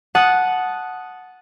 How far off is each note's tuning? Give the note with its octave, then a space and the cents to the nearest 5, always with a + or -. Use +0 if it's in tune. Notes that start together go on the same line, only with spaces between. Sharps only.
F#5 -5 A5 -15 D#6 +0